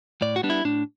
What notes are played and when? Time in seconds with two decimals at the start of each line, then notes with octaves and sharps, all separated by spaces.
0.22 A2 D5
0.36 F#4
0.43 G3 B3 D4
0.50 E4
0.65 A2 D4